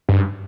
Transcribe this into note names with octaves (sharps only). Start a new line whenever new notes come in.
G2